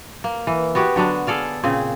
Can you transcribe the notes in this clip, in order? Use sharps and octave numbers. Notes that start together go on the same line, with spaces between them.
A#3
E3
B3 F#4 G4
D3 F#3 B3 D4
G#4 A4 D5 F5
A#2 C#3 C4 G#4